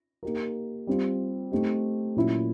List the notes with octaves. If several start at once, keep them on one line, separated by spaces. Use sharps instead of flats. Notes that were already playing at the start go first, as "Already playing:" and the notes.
A#3 D#4 G4 A#4
G3 C4 F4
A3 C4 D#4 G4
A#2 F#3 A3 C#4 E4